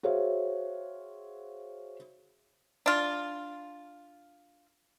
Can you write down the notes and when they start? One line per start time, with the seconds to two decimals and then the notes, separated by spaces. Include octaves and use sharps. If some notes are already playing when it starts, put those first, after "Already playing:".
0.03 F#4 G#4 C5 C#5 E5 F5
2.86 D4 F4